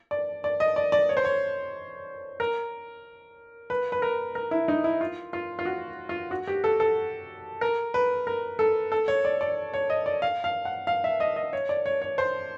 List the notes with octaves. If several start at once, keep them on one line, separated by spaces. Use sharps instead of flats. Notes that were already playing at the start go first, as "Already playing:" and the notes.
D5
D5
D#5
D5
D5
C#5
C5
C#5
A#4
B4
B4
A#4
A#4
E4
D#4
E4
F4
F4
F4
F#4
F4
F#4
G4
A4
A4
A#4
B4
A#4
A4
A4
C#5
D5
D5
C#5
D#5
D5
F5
F5
F#5
F5
E5
D#5
D#5
C#5
D5
C#5
C#5
C5